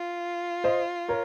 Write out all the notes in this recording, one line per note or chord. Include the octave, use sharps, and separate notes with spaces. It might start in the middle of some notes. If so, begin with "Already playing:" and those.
Already playing: F4
C5 D#5
A#4 C#5